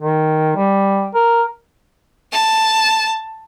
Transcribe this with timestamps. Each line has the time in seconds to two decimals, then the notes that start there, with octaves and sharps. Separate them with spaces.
0.01 D#3
0.56 G3
1.14 A#4
2.32 A5